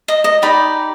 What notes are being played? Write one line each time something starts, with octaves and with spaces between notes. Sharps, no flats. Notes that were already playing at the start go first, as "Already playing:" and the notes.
D#5
D#5
D#4 G4 D5 B5